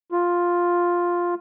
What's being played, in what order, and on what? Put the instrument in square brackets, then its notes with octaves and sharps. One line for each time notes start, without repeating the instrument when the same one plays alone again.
[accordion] F4